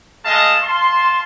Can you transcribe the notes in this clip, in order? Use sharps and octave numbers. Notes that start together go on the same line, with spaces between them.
G#3 A3 D#5 F5 A5
F5 A5 C6